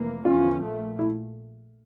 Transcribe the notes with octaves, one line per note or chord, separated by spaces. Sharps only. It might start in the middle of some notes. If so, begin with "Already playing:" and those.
Already playing: F1 E3 A#3
E2 D3 F3 C#4 F4
A#1 A#2 A3
E4